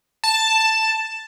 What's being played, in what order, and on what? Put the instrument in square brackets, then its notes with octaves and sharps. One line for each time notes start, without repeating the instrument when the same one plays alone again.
[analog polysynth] A5